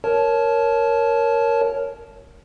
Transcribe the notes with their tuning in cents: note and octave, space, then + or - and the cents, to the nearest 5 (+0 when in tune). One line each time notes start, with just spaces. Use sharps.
A#4 +0 C#5 +0 A5 -20